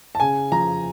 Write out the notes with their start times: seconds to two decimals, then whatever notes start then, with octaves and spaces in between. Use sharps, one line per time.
0.15 A5
0.20 C#3 G#5
0.52 F3 A#5